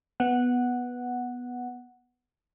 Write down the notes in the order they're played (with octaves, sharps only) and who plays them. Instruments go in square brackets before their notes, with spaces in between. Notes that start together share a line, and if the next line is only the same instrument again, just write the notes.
[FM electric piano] B3 F#5